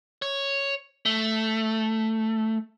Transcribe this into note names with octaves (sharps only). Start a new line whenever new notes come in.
C#5
A3